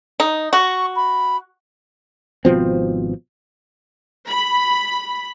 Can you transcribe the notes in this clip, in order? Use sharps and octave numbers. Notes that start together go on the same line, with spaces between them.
D#4
F#4 C#6
B5
G#1 B2 F3 C4
B5